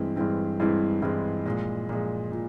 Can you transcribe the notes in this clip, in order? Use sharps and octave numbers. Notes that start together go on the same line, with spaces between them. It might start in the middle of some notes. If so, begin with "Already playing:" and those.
Already playing: G2 E3 G#3 C4 E4
G2 E3 G#3 C4 E4
G2 E3 G#3 C4 E4
G2 E3 G#3 C4 E4
A#2 F3 G#3
A#2 F3 G#3
A#2